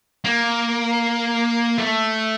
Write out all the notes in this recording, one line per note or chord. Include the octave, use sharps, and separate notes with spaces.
A#3
A3